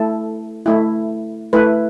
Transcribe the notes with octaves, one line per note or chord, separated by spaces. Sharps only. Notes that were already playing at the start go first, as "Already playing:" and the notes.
Already playing: A3 E4 A4
A3 E4
A3 E4 B4